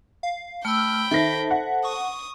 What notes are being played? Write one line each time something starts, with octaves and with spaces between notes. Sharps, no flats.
F5
A3 G5 B5 E6 F6
D#3 A4 C5 E5 A5 A#6
F#5
C#6 D#6